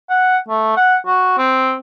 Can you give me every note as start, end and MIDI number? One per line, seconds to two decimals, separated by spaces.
0.10 0.37 78
0.48 0.72 57
0.77 0.96 78
1.06 1.38 66
1.38 1.75 60